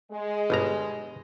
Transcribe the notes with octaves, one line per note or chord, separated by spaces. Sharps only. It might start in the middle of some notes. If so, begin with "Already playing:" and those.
G#3
G1 B2 A#5